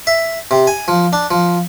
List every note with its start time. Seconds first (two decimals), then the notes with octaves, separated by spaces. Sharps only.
0.07 E5
0.51 C3
0.67 G#5
0.88 F3
1.13 D4
1.31 F3